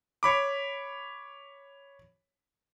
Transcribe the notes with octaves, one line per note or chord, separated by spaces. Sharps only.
C#5 B5 D6